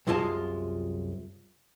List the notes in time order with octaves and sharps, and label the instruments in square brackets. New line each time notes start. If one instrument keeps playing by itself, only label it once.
[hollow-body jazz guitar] C2 F#2 G#3 F4 D#5 A5